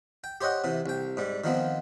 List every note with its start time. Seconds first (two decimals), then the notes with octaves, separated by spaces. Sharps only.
0.24 G5
0.41 G4 C5 C#5 D#5 F#5
0.64 C3 E3
0.86 C2 G5
1.17 G#2 G3
1.44 D#3 F3 B3 C4